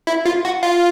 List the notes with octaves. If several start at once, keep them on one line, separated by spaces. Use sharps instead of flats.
E4
F4
F#4
F4